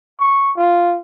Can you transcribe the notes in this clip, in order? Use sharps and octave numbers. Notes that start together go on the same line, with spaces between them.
C#6
F4